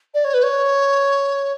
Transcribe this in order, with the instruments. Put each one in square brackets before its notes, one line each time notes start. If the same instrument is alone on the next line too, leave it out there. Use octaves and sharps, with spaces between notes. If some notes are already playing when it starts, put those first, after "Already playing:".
[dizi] D5
C#5
B4
C#5